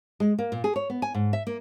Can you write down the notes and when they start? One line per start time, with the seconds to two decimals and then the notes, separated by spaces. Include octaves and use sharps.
0.20 G#3
0.38 A#3
0.52 A#2
0.64 G#4
0.76 C#5
0.90 B3
1.02 G#5
1.14 G#2
1.33 E5
1.47 A#3